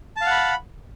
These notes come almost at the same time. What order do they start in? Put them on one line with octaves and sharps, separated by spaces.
A5 F5 F#5 B5